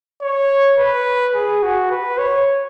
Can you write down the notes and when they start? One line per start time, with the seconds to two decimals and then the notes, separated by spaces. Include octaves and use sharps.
0.22 C#5
0.78 B4
1.34 G#4
1.63 F#4
1.90 B4
2.18 C#5